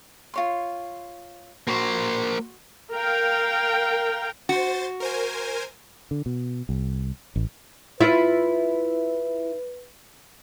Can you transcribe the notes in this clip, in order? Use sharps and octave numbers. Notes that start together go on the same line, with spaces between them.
F4 C#5 C6
A#3 F#4 C5 C6 C#6
A#4 F5 G5
F#4 C5 A6
A#4 C5 G#5
D3
B2
C2
A1
E4 F4 B4 E5